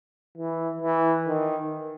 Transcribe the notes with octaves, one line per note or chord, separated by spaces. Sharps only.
E3
E3
D#3